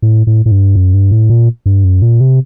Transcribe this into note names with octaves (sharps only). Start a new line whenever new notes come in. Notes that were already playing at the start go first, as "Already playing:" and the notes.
A2
A2
A2
G2
F#2
G2
A2
A#2
G2
F#2
A#2
C3